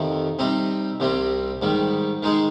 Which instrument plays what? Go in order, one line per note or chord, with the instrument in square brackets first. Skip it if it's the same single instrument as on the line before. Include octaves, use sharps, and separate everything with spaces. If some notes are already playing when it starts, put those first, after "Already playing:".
Already playing: [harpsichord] F2 C3 D#3
C3 G3 C4 D#4
C2 C3 G3 C4
G#2 D#3 G3
D#3 G#3 D#4 G#4